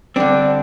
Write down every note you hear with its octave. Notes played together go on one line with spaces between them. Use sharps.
D3 G3 C4 D4